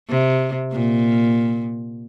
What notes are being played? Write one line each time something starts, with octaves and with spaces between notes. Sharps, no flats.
C3
A#2